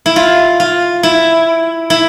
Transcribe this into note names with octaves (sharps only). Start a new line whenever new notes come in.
E4
F4
F4
E4
E4